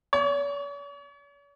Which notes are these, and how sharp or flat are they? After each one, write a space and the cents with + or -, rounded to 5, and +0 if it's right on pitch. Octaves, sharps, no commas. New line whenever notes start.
C#5 +45